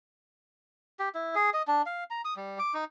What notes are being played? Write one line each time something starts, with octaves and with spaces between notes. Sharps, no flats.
G4
E4
G#4
D#5
D4
F5
A#5
D#6
G3
D6
D#4